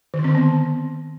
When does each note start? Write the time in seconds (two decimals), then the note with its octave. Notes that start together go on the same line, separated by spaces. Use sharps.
0.14 D#3
0.19 D3
0.24 C4
0.29 D3
0.35 B3